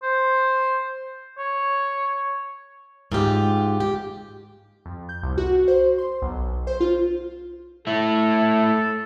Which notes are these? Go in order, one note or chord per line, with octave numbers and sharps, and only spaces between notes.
C5
C#5
G#2 F4 G4
G4
F2
G6
C2
F#4
C5
C6
B1
C5
F4
A3 E4 A4